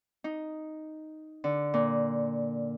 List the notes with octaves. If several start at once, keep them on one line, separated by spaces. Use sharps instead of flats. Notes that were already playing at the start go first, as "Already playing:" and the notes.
D#4
D3
A#2